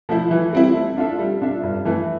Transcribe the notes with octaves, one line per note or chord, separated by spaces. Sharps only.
F3 A3 E4
E3
G3 C4 E4
A3
D4 F4 A4 E5
G3
D4 F4 A4 E5
G2
E3 A3